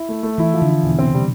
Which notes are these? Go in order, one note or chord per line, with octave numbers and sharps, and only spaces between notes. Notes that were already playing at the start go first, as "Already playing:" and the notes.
Already playing: E4
A3
A3
E3 E4
F3
D3
E4
E2 B2
C4
C3
G3